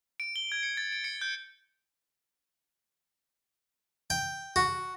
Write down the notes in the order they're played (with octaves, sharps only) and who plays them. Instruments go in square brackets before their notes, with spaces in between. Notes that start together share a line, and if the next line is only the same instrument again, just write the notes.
[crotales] D7
G7
G#6
C#7
A6
D7
C#7
G6
[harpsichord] G5
F#4